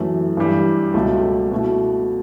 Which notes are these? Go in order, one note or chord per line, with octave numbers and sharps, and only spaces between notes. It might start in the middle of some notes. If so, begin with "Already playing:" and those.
Already playing: F#2 E3 A3
G2 E3 G3
C#2 B2 A3
B2 A3 E4